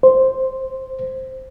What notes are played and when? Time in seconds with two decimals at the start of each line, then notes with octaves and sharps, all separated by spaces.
0.03 C5